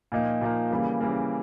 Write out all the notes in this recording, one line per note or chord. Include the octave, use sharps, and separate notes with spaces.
A#2 F3 A#3 D#4
A#2 F3 A#3 D#4
C#3 E3 G3 A#3
C#3 E3 G3 A#3